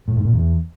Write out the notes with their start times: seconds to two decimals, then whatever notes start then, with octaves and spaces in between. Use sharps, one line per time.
0.08 A2
0.16 G#2
0.25 A#2
0.33 E2